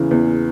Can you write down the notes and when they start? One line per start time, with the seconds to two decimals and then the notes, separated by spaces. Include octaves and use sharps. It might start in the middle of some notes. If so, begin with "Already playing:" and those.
Already playing: E2 C#3 E3
0.11 E2